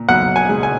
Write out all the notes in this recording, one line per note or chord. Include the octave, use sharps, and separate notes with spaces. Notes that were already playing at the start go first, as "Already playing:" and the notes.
Already playing: A#2
B1 F#5
G#5
G#3
G#5